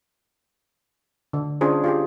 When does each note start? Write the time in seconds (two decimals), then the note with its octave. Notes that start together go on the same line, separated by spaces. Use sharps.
1.33 D3
1.61 C#4 D4 F4 G#4 C5
1.84 F4 G4 G#4